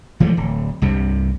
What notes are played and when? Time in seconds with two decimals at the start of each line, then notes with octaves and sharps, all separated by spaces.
0.20 E3 F3 G#3 A3
0.37 D1
0.82 C2 G2 C3